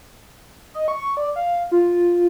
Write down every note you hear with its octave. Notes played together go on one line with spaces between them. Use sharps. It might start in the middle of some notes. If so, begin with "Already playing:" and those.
D#5
C#6
D5
F5
F4